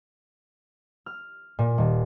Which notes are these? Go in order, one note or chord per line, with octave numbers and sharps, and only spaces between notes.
F6
A#2
D#1